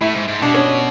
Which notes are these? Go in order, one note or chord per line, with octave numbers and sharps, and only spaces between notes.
A2 E4
G#2
G#2
B2 D4
C#4